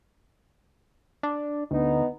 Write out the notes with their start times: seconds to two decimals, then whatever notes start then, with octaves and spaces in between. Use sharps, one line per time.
1.23 D4
1.71 D2 B3 D#4